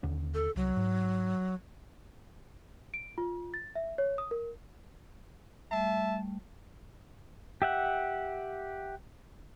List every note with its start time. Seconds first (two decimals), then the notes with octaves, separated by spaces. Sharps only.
0.03 D#2 D3 C#4
0.34 A4
0.56 C2 F#3
0.77 G#2
2.94 D7
3.18 F4
3.54 A6
3.75 E5
3.98 C#5
4.18 D#6
4.31 A#4
5.71 G3 A3 E5 A5
7.62 G4 E5 F#5